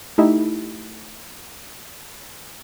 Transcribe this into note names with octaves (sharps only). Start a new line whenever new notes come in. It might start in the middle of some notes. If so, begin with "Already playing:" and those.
A3 D#4 E4 G4